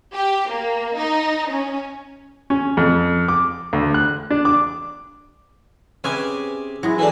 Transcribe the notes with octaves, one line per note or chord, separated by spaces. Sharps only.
G4
A#3
D#4
C#4
C#4
F2
D6
D2
F#6
D4
D6
C3 C#4 G#4 B4 G#5 D6
F#3 G#3 E4 G#4
E3 A3 D4 G#5